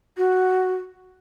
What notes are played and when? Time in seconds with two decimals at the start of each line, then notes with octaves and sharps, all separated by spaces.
0.17 F#4